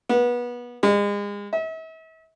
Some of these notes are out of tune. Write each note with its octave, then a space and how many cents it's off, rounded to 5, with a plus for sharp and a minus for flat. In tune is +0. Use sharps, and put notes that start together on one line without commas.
B3 -25
G#3 -35
E5 -40